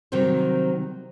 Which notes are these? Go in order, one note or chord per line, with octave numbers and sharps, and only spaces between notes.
C3 D#3 F#3 G3 C4 C5